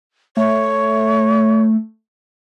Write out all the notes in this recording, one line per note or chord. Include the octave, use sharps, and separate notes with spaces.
A3 C#5